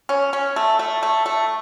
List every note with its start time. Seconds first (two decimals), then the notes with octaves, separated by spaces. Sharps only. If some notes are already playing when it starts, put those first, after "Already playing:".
0.09 C#4
0.33 C#4
0.56 A3
0.79 A3
1.03 A3
1.26 A3